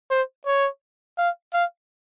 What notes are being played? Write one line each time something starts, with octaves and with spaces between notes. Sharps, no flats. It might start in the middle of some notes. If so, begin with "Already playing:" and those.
C5
C#5
F5
F5